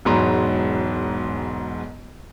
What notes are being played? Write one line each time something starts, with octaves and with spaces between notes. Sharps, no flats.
E1 G#2 F#3 A#5 C6